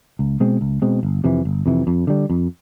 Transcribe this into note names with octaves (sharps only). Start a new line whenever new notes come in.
C#2
B2 G#3 C4
C#2
B2 G#3 C4
G1
F2 C3 E3
G1
F2 C3 E3
F2
D3 G3
F2